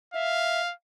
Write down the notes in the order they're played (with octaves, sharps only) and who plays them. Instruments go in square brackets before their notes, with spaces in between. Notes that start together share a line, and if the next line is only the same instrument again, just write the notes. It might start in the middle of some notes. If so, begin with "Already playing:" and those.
[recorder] E5 [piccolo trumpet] F5